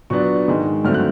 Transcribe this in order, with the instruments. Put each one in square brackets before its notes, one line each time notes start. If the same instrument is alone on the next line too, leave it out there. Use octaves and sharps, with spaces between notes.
[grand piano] A#2 F#3 B3 D4 C#6
G#2 D#3 G#3
G2 D3 F#3 A3 C4 F6
F#6